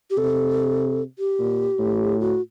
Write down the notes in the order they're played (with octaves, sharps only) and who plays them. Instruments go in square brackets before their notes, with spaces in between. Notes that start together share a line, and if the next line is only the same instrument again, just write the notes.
[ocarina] G4
[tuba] C3 [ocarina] A4
[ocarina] G4
[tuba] A#2
A2
[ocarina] F#4